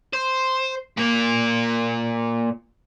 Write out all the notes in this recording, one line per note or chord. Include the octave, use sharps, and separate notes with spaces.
C5
A#2 A#3